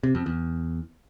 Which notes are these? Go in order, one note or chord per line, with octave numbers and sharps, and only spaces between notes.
C3
F2
E2